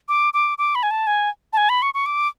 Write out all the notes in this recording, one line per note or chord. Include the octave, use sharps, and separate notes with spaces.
D6
D6
D6
B5
G#5
A5
G#5
A5
G#5
B5
C#6
C#6
D6